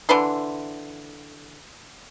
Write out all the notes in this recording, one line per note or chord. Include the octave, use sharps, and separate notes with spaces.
D3 E3 B4 C6